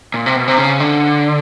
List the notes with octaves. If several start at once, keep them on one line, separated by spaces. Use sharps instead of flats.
A#2
C3
B2
C3
C#3
D3